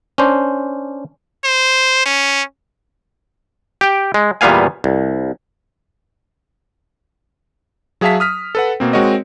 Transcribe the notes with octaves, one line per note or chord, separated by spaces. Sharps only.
C#4 D4 C5
C5
C#4
G4 G5
G#3
E2 A#2 G3 B3 F5 G#5
C2
F#3 G#4 E5 F5 A5 B6
D#6 F6 B6
A4 B4 F#5
B2 A#3 C4
G#3 C4 F#4 A#4 C#5 D#5